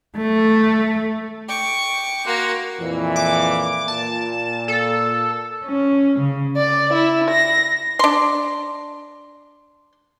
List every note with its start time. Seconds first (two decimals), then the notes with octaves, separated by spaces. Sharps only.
0.17 A3
1.49 G5 C#6 D6
2.26 A#3 F#4 C6 F#6
2.79 F2 A#2 E3
3.16 D6
3.88 A#2 A5
4.68 A4
5.65 C#4
6.20 C#3
6.56 D5
6.92 E4
7.29 A#6
7.99 D4 C6